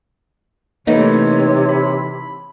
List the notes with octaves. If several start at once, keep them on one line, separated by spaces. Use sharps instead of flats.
C3 E3 A3 A#3 D#4 C#5
B5